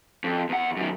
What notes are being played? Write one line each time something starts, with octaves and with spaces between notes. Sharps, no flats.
F2
E2 F#5
F#2 D#3